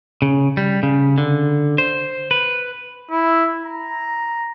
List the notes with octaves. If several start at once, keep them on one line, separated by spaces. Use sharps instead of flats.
C#3
G3
C#3
D3
C5
B4
E4
A#5